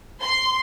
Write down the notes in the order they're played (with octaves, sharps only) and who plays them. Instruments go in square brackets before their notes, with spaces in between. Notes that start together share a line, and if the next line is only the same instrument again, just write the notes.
[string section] C6